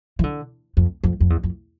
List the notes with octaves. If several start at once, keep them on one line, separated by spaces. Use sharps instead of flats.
E3
D3
F2
F2
F2
E2
F2